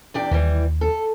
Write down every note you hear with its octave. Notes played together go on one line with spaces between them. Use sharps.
E2 D4 G4
D#2 E3 G3
A4